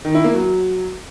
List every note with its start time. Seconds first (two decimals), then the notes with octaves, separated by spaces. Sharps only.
0.05 D#3
0.15 E4
0.24 A#3
0.34 F#3